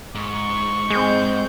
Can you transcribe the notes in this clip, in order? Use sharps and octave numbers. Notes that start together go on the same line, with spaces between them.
G#2 C#6
G#3 C4 G6